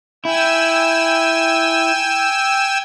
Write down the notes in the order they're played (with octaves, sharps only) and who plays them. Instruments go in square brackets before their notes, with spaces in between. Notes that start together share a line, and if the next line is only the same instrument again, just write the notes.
[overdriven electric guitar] E4 [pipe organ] G5 G#5 E6